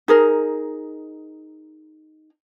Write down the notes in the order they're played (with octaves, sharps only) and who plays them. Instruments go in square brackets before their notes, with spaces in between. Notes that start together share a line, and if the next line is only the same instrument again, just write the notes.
[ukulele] D#4 G#4 A#4